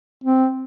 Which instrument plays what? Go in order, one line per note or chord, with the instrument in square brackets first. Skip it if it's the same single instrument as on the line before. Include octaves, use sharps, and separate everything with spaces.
[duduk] C4